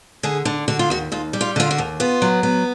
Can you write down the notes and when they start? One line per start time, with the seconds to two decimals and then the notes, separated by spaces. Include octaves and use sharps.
0.23 D3 G#4
0.45 D3
0.68 D3 F#4
0.79 F4
0.90 D#2 F#4
1.12 D#2 F4
1.33 G3
1.41 F4
1.56 D3 F4
1.71 F#4
1.78 D#2
2.00 B3 F4
2.22 F#3
2.43 B3